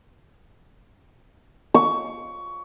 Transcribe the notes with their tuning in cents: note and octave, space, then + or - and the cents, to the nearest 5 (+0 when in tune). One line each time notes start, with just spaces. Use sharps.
C#6 +20